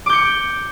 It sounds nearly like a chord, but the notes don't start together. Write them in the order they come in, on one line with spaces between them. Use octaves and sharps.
D6 G6 C#7